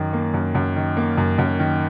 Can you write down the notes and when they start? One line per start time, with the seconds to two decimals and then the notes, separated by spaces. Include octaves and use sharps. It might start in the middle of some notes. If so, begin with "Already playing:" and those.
Already playing: F#2 D#3
0.13 A#3
0.34 F#2
0.55 F#2
0.76 D#3
0.97 A#3
1.17 F#2
1.38 F#2
1.59 D#3